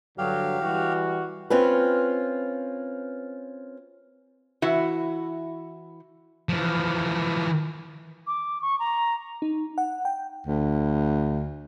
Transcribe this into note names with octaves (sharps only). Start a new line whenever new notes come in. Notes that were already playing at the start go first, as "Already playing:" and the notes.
G2 D3 F#3 G4 F5
E3 G3 F#4
C4 C#4 F4 B4
E3 E4 F#4
E3 F3
D6
C#6
A#5
D#4
F#5
G5
D2